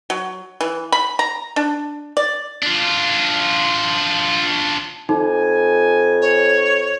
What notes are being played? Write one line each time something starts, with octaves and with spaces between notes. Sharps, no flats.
F#3
E3
B5
A#5
D4
D5
D4 F4
F2 D#4 G#5
C#5